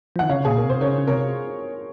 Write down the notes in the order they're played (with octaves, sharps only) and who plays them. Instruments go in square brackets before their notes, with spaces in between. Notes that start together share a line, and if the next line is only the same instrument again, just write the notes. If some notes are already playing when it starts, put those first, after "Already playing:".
[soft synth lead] F3
[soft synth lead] D#3 [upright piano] F#5
[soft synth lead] C#3 [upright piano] C#5 F5
[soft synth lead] A#2 [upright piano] G#4
[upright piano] A#4
[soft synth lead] C3
[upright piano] C5
[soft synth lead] C3
[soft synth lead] C#3 [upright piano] A#4 C#5
[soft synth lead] C#3
[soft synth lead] C3 [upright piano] A#4 C#5